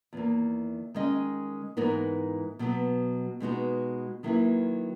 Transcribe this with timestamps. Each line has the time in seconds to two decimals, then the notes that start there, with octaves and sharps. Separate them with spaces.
0.13 E2 D#3 A#3
0.94 D#3 G#3 C#4 G#4 D#5
1.77 G#2 E3 B3 D#4 A#4
2.59 B2 F#3 B3
3.40 B2 G#3 B3 D#4 F#4
4.23 D#3 F#3 A#3 E4 B4